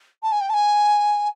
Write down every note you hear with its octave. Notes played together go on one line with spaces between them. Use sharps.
A5
G#5
G5
A5
G#5